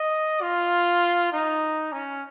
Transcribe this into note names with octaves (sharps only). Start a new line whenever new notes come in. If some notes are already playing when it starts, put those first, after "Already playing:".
Already playing: D#5
F4
D#4
C#4